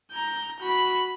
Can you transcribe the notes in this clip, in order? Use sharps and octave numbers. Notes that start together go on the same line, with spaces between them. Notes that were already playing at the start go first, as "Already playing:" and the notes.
A#5 G6
F#4 B5